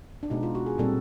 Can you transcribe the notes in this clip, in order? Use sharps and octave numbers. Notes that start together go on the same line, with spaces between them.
D4
B2 G#3 B3 D#4
F4
F#4
G#4
A#2 G3 C4 A4